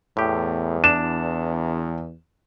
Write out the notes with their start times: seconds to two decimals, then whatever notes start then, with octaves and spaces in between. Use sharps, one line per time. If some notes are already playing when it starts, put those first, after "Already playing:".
0.17 E2 A2 G4
0.84 D4 E7